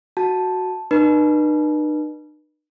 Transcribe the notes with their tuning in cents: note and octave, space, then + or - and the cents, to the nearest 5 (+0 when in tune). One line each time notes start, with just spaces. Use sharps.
F#4 +0 A5 -5
D#4 -45 B4 -35